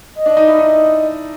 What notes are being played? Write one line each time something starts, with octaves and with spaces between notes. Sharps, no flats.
D#5
D4
D#4
E4
D#4